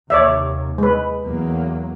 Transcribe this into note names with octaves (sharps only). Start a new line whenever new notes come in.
D#2 C3 C#5 D5 E5
G#3 B4
E2 F#3 A#3